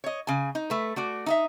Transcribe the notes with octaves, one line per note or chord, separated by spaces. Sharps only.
C#5 D#5
C#3 G#5
D#4
A3 B4
A3 F#4 D5
D#4 D#5 E5